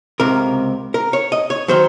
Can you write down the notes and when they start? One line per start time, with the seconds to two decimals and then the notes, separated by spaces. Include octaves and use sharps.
0.20 C#2 C3 A#4
0.94 A#4
1.13 C#5
1.32 D#5
1.50 C#5
1.68 D#3 F#3 C5